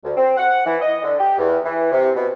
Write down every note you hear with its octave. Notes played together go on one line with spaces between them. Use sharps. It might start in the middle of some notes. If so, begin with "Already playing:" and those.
D2
C4
F#5
E3
D#5
D3
G4
E2
E3
C3
B2